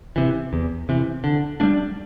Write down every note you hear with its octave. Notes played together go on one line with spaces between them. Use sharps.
C3 E3
E2
C3 E3
D3
G3 A#3 D4